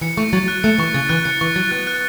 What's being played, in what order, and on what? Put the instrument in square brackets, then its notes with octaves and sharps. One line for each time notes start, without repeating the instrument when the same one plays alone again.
[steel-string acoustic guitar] E3 [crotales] C#7
[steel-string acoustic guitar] A3 [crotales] C#6
[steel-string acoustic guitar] F#3 [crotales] A6
[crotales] F#6
[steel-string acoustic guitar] A3 [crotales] C#7
[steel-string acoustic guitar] E3 [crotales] C#6
[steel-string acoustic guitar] C#3 [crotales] A6
[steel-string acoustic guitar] E3 [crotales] F#6
[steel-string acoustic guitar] C#3 [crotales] C#7
[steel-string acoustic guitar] E3 [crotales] C#6
[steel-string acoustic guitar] F#3 [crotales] A6
[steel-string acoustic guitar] B3 [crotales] F#6
[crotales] F#6